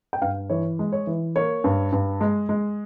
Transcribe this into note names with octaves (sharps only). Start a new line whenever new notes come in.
G5
G2 F5
E3 C#5
G#3
C#5
E3
A#3 C#5
G2
G2
G#3
G#3